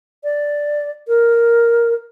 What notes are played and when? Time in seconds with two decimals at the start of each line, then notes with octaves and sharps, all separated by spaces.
0.24 D5
1.08 A#4